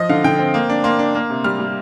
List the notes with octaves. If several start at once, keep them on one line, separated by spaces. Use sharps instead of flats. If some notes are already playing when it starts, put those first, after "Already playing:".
Already playing: F3 D#5
D3 F5
D3 G5
C4
A#3
D4
A#3 C6
D4
A#3
C3
G3 F6
G3